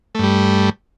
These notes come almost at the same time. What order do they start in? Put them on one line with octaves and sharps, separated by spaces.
A3 G2 G3